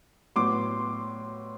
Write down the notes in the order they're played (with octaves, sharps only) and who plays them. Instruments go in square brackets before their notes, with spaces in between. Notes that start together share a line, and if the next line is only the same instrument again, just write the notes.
[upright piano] A2 F#3 B3 C6 D6